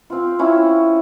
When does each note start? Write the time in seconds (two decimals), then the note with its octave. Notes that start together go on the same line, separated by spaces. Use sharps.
0.10 C4 F4
0.39 C#4 E4